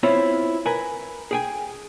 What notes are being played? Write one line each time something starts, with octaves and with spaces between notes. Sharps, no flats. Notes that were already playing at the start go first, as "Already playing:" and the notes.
B3 C4 E4 F4 C#5
A#4 B4 G#5
G#4 G5 G#5